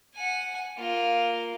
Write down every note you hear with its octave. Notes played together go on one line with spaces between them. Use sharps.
F#5 G#5
A#3 F4